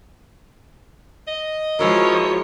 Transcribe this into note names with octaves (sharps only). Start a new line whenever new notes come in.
D#5
F3 G#3 E4 F#4 A#4 C#5